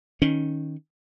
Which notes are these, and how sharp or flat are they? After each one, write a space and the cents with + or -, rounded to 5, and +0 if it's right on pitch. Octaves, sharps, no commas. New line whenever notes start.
D#3 +0 C#4 +0